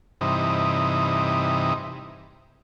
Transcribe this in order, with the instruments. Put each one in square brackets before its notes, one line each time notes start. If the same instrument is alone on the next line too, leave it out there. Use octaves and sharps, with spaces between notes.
[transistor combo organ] G2 C3 E3 D#4